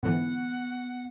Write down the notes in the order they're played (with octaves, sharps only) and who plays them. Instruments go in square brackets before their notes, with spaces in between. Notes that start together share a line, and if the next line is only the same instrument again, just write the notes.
[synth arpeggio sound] G#2 D3 E3 [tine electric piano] B3 [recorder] F#5